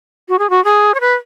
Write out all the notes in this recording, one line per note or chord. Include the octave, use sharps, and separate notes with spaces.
F#4
G#4
F#4
G#4
C#5
B4